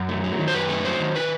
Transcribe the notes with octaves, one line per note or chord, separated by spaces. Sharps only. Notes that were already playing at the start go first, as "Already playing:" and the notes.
Already playing: F#2 A#4
A3
F#3
D#3
C5
F#2 B4
A3
F#3 C5
D#3
B4